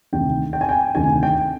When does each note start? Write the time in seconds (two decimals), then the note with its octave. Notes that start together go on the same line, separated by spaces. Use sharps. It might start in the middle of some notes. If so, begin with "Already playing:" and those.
0.13 D2 C3 D#3 G5
0.53 G5
0.61 G#5
0.69 G5
0.95 D2 C3 D#3 G#5
1.23 G5